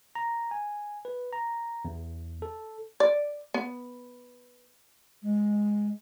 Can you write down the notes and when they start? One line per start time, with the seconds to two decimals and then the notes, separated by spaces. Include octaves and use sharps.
0.15 A#5
0.51 G#5
1.05 B4
1.33 A#5
1.85 E2
2.42 A4
3.00 D5
3.54 B3
5.23 G#3